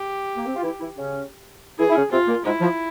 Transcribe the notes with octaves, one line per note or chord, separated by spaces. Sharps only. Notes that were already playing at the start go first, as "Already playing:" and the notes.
Already playing: G4
A#3
C3 C4
F4
E3 E4
E3 E4
C#3 C#4
E3 E4 G#4
E4
C#3 C#4
C3 C4 F4
A#2 A#3
G#2 G#3 E4
F3